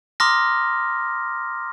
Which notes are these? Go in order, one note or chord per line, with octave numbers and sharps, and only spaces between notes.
A#5 C6 D6 D#6 F6 A#6